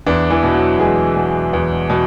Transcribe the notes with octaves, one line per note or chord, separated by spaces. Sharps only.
E2 D4
E3 E4
B2
F#3 F#4
E2 G#3 G#4
B2
E2
B2